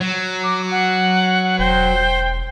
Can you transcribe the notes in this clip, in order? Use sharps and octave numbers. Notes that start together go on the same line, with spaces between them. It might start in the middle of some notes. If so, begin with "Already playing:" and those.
F#3
D6
F#5
E1 C5 G5